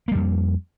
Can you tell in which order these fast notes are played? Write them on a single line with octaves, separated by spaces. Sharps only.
A#3 G3 F2